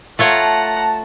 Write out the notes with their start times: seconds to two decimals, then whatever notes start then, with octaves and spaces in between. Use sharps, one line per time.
0.19 A3 F4 C#5 F#5 A5 A#5